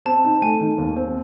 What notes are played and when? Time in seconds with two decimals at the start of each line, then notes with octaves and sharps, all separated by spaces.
0.06 C4 A5
0.24 D#4
0.42 A3 G#5
0.61 D#3
0.78 D#2
0.96 C4